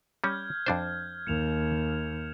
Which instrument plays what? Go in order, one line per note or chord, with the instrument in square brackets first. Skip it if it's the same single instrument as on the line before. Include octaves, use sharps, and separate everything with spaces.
[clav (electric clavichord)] G3 C#4 [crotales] F6 G6 G#6
[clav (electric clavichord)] F2 D4 C5
[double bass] D#2 [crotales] C#7 E7 F7